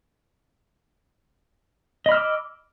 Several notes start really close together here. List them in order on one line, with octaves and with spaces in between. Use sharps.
D#5 B5 F6 E6 D6